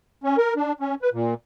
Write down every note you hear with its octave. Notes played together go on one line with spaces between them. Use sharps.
C#4
A#4
D4
C#4
B4
A#2